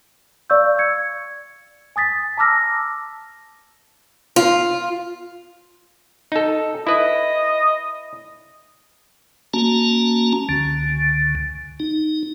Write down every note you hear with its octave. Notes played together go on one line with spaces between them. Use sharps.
D5 F5 C#6 E6 G6
G#6 C#7
G#5 D#6 A6 B6
A5 A#5 D6 E6 F6 A#6
F4
D#4 A4
E4 B4 D#5
A#3 C#4 F#4 A5 A#5
C#2 D3
D#4